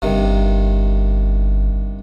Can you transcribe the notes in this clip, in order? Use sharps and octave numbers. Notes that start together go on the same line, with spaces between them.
G1 G2 C3 D#3